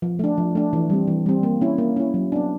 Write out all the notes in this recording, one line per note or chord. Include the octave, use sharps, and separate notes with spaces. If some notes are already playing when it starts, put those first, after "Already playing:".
F3
A3 D4
F3
A3 D4
E3
G3 C4
E3
G3 C4
A#3
C#4 E4
A#3
C#4 E4
F#3
B3 D4